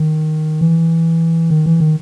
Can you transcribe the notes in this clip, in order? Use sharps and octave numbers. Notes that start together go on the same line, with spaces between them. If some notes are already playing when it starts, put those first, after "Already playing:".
Already playing: D#3
E3
D#3
E3
D#3